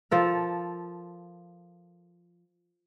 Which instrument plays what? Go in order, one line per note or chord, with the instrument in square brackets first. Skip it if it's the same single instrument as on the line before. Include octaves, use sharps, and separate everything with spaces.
[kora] F3 A4 A#4